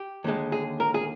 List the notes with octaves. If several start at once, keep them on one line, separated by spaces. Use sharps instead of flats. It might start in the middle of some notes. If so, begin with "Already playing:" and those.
Already playing: G4
D#2 D3 G#3
G#4
A#4
G#4